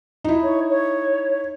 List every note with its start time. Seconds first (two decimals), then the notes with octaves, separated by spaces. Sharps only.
0.24 D#4 E4
0.43 C#5
0.69 C#5